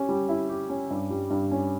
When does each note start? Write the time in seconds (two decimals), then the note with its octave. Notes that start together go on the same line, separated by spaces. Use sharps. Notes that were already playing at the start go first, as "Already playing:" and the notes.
Already playing: C#4 G4
0.09 G3
0.29 E4
0.49 G4
0.69 C#4
0.91 G2
1.11 G3
1.30 G2
1.51 C#4